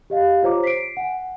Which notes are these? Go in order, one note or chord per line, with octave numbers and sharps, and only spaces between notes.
G4 D#5 F5
F4 C5 C#5 A#5 D6
B6 C7 D7
F#5 G#5